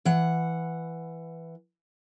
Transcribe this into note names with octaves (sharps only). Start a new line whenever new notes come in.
E3 F#5